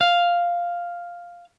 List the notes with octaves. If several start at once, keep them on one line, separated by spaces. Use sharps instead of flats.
F5